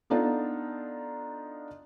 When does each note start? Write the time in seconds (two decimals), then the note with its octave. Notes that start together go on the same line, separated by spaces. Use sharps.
0.10 B3 D4 D#4 F4 A4